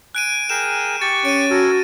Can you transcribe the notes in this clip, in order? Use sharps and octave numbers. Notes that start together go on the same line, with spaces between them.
G#5 F#6 D7 D#7
G#4 A#4 G5 E7
G4 C#6 A6
C#4 D7 D#7
F#4 A4 A#4 G#5